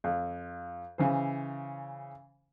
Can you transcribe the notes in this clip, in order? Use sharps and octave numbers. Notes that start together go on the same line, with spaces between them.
F2
C#3 E3 C5